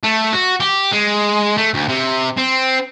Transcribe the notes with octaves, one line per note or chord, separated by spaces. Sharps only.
A3
F#4
G4
G#3
A3
D2
C3
C4